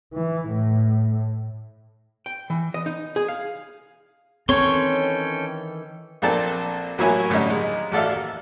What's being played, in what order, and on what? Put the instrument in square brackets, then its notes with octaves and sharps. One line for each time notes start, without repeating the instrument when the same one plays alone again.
[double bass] E3
A2
[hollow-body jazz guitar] G5
E3
D#5
D#4
G#4
F5
[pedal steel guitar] D#3 E3 C6 [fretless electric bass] C4 [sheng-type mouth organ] C#4 A4 G5 [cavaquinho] C#5
[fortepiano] A#1 A#3 C4 D4 A4 A5
A1 F#3 A#3 E4 C#5 G#5
A2 D3 G3 C#4 D#4
D#2 G#3
A1 F#4 A4 D5 E5 F5
D#2